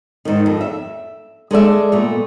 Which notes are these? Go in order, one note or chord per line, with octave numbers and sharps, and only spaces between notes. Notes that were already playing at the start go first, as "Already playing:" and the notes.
G#2 D#3
F2
E5
G#3 A4 D5 E5
A#2 A3 B3